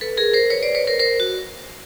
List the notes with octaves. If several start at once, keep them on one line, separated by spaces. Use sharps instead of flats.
A4 B4
G#4 A#4
A#4 C5
B4 C#5
C5 D5
B4 C#5
A#4 C5
A#4 C5
F#4